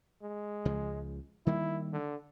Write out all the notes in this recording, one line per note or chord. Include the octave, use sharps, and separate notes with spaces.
G#3
C#2 C#3 F3
D#3 G3 A#3 E4
D3